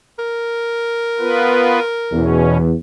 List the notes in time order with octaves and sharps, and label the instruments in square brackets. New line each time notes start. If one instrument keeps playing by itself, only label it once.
[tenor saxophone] A#4
[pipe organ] B3 F4 B4
[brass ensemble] E2 [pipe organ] B2 C#4